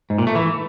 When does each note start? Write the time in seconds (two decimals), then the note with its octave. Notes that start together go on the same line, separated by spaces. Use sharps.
0.10 G#2
0.18 A#2
0.27 A3
0.35 E3